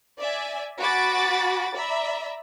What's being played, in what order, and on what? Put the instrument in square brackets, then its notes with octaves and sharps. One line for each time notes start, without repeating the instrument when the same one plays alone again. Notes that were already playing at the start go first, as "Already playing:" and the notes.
[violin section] D5 E5 G#5
F#4 G#5 B5 D6 A6 D7
D5 E5 A#5 B5